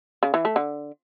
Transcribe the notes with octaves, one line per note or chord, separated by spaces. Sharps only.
C#3
E3
A3
D3